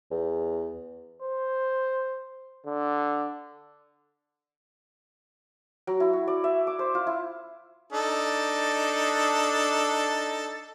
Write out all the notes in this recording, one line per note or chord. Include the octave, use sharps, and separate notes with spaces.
E2
C5
D3
F#3
E4
F#4
D5
E5
D6
C5
F4
E4
D4 D#4 A4